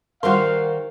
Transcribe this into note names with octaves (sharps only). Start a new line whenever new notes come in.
D#3 G3 F#4 A#4 C5 F5 C6